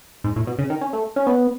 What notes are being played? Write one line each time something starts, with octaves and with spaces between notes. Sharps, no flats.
G#2
A2
B2
C#3
D#3
C#4
A3
C#4
B3